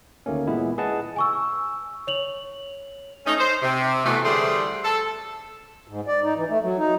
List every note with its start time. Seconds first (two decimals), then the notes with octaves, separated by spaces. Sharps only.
0.26 D2 D#3 A3 A#3 C#4
0.47 A#2 E3 G#3 B3 E4
0.78 G#4 B4 D#5 F#5 A5
1.16 G#5 C#6 E6
2.07 C#5 F7 F#7
3.26 A3 C#4 D#4
3.38 C5
3.62 C3
4.05 B2 E3 A3
4.24 D3 E3 G3 A3 G#4 C5
4.84 A4
5.88 G#2
6.07 D5
6.23 D#4
6.36 E3
6.49 A3
6.62 F#3
6.78 D#4